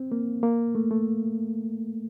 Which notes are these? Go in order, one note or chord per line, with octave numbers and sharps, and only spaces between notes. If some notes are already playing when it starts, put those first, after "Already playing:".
Already playing: C4
A#3
A#3
A3
A3